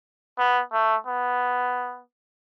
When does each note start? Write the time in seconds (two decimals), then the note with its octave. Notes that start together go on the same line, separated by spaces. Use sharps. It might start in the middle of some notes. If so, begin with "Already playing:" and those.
0.38 B3
0.72 A3
1.06 B3